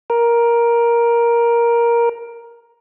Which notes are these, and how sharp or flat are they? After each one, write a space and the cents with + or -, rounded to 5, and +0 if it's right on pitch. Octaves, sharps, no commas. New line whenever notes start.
A#4 +10